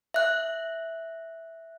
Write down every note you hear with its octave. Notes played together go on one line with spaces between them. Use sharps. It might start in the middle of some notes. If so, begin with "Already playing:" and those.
E5 F#6